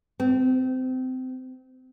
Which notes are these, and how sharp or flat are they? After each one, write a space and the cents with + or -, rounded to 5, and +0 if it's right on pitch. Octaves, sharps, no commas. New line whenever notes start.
C4 -25